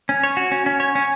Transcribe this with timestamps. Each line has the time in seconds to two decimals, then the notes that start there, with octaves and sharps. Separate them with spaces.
0.09 C#4
0.23 C#5
0.37 F#4
0.52 C#4
0.66 C#4
0.80 C#5
0.95 C#4